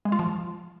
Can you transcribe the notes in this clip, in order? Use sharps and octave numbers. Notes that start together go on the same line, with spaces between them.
G#3
F4
F3